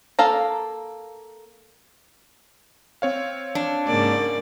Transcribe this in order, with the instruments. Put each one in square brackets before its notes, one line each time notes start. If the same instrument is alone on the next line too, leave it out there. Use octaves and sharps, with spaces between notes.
[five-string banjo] A#3 A4 F5 A#5
[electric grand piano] C4 C#5 F5
[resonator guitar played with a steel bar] D4
[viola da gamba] G#2 C#3 D5 [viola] A#3